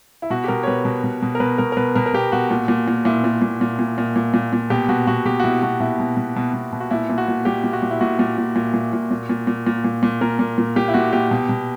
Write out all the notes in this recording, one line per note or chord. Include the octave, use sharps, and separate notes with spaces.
E4
B2 F#4
G4
B2 A#4
C#5
B2 B4
B2
B2
B2
A#4
B2 B4
B2 A#4
A#4
B2 B4
B2 A#4
A#4
B2 G4
B2 F#4
A#2
A#2
A#2
A#2 E4
A#2
A#2
A#2
A#2
A#2
A#2
A#2
A#2
B2 G4
B2 F#4
B2 F#4
B2 G4
F#4
B2 E4
B2 F#4
B2 E4
B2
B2
B2
B2
B2
F#4
A#2 E4
A#2
F#4
A#2
A#2 G4
A#2
F#4
A#2
E4
A#2 F#4
A#2
A#2
A#2
A#2
A#2
A#2
A#2
A#2
A#2
A#2
A#2
A#2 A#4
A#2
A#2
A#2 G4
E4
A#2 F#4
A#2 G4
B2
B2